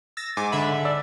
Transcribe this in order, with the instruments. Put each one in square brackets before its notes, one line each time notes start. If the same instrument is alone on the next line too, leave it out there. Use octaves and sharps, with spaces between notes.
[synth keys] E6 A6 A#6
[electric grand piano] G#2 [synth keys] G#5 D6
[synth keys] D3 E5 B5
[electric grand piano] D5 E6